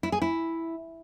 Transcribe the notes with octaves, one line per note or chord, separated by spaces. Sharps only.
E4
G#4
E4